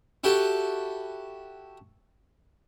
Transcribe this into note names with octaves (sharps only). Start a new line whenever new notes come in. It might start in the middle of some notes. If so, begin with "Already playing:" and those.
E4 F#4 G4 A4